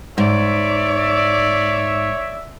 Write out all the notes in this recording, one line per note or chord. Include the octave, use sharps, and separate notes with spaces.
G#2 C#5 D5 E5